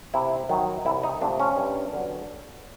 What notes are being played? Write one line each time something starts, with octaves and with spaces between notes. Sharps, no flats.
C3 E4
D#3 F#3
C2 E4
D#4
C3 F3 A3 C4 D4
C#4
G2
D3 F#3 B3